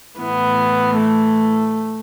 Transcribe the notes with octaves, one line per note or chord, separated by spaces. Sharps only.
A2 E3 B3
A3